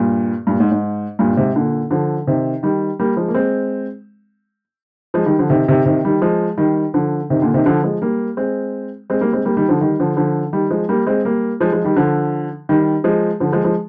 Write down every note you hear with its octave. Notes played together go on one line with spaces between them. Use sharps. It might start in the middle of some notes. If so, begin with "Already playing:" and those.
Already playing: G2 A#2
G2 A#2
G#2
G#2
G2 A#2
G#2 C3
A#2 D3
D3 F3
C3 D#3
D#3 G3
G3 A#3
F3 G#3
A#3
G#3 C4
F3 G#3
D#3 G3
D3 F3
C3 D#3
C3 D#3
C3 D#3
D#3 G3
F3 G#3
D#3 G3
D3 F3
C3 D#3
A#2 D3
C3 D#3
D3 F3
F3 G#3
G3 A#3
G#3 C4
G#3 C4
G3 A#3
G#3 C4
G3 A#3
D#3 G3
D3 F3
D#3 G3
D3 F3
D3 F3
D#3 G3
F3 G#3
G3 A#3
G#3 C4
G3 A#3
F3 G#3
F3 G#3
D#3 G3
D3 F3
D#3 G3
F3 G#3
D3 F3
F3 G#3
F3 G#3